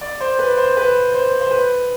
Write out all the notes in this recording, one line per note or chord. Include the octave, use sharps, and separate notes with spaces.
D5
C5
B4
C5
B4
C5
C5
B4